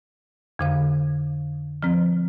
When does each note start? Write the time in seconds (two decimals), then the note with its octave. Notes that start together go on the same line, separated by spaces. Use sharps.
0.59 F2 D3 F5
1.83 F3 C4